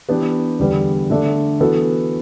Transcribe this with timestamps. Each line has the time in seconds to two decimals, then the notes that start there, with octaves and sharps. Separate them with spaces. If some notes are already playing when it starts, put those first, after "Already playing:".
0.09 E3 B3 D4 G4 B4
0.59 E2 D3 G3 B3
1.10 D3 A3 D4 A4
1.60 E3 B3 F#4 A4